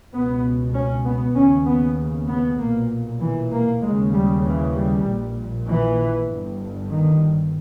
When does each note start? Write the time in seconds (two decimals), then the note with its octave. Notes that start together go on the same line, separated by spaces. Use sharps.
0.13 C#2 B2 B3
0.75 C#4
1.05 B3
1.36 D#2 C#3 C#4
1.66 B3
2.29 B3
2.59 B1 A#2 A#3
3.21 E3
3.52 A#3
3.82 D#2 C#3 G#3
4.13 G3
4.44 E3
4.75 G3
5.05 A#1 A#2
5.67 E3
6.28 G1 G2
6.90 D#3